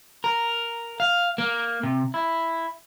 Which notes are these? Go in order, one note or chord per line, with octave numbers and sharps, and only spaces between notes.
A#4
F5
A#3
C3
E4